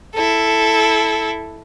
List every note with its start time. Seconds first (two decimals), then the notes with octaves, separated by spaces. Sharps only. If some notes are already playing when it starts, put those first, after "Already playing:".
0.15 E4 A4